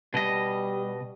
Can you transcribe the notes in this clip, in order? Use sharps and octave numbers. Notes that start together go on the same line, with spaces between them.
B2 G3 D#5